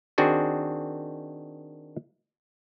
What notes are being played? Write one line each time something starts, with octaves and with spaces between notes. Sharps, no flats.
D#3 C4 D4 F#4 G#4